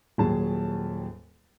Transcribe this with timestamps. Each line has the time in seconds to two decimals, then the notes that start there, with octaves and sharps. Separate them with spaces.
0.18 D#1 D#2 F#3 G#4 A5